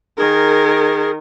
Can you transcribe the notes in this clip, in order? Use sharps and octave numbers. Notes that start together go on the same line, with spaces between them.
D#3 G#4 A#4